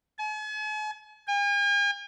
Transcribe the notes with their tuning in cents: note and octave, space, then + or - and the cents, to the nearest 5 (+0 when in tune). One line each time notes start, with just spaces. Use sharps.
G#5 +45
G#5 -45